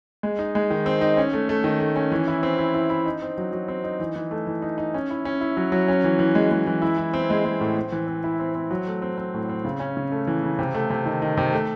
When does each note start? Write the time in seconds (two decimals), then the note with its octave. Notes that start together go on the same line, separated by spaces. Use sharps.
0.23 G#3
0.39 D#4
0.55 G#3
0.70 D#3
0.86 C4
1.01 D#4
1.17 C#4
1.33 A3
1.49 A3
1.64 D#3
1.80 A3
1.96 C#4
2.12 E3
2.27 E4
2.43 C4
2.58 E4
2.74 E4
2.90 E4
3.06 D#4
3.22 C4
3.38 F#3
3.53 F#3
3.68 C4
3.84 D#4
4.00 E3
4.16 E3
4.31 A3
4.47 E3
4.62 D#4
4.78 D#4
4.94 C#4
5.10 E4
5.25 C#4
5.41 E4
5.57 F#3
5.72 F#3
5.88 C#4
6.04 E3
6.19 E3
6.35 G#3
6.51 G#3
6.67 E3
6.82 E4
6.98 E4
7.14 C4
7.30 G#3
7.45 G#3
7.61 A2
7.77 C4
7.92 E3
8.07 C4
8.24 E4
8.40 C4
8.55 C4
8.71 F#3
8.87 A3
9.02 C4
9.18 C4
9.34 A2
9.49 C4
9.65 C#3
9.80 C#4
9.97 C#3
10.12 A3
10.27 E3
10.43 C#3
10.59 C3
10.74 A3
10.90 C3
11.06 D#3
11.22 D#3
11.37 C3
11.53 A3